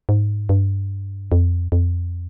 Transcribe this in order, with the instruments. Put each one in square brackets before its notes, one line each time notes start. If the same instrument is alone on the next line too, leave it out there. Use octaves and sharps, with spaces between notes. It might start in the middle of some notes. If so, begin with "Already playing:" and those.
[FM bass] G#2
G2
F2
F2